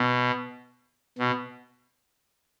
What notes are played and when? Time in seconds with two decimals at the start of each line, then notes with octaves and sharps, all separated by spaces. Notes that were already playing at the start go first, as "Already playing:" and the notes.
Already playing: B2
1.19 B2